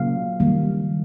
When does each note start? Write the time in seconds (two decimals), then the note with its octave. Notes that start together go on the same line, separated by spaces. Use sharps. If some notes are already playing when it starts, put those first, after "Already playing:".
Already playing: C#3 F#3 A#3 F5
0.40 D#3 G3 A#3